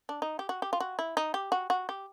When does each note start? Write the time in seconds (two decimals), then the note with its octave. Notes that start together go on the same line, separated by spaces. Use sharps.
0.09 D4
0.22 D#4
0.39 G4
0.49 F#4
0.62 G4
0.73 F4
0.80 F#4
0.99 E4
1.17 D#4
1.34 G4
1.52 F#4
1.70 F#4
1.89 G4